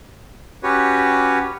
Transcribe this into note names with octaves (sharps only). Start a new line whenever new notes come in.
C#4 F#4 G4 B4 C#5